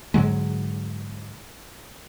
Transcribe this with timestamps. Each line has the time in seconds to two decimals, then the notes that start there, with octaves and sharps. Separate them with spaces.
0.14 G#2 D3 F#3 G#3